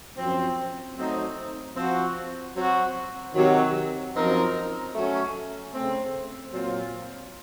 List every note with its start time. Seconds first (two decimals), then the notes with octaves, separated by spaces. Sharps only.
0.17 F#2 F3 C4
0.96 F#3 A3 C4 D#4
1.75 F3 C4 F#4
2.54 F#3 C4 F#4
3.35 C3 D#3 F#3
4.14 F#2 F3 C4 D#4 A#4
4.94 F#3 A3 C#4
5.73 C#3 A3 C4
6.52 A#2 F#3 C4 F4